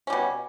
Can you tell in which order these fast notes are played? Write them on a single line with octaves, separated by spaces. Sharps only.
C#4 G3 B2